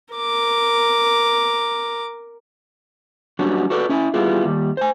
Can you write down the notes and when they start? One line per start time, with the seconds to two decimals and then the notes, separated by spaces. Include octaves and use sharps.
0.14 A#4 D6
3.39 F#3 G3 B3 C#4 D4 F#4
3.70 F#4 A4 B4 D5
3.89 C#4 E4 G#5
4.14 G3 B3 E4 F4 G#4
4.45 D#2 G3
4.77 C5 G#5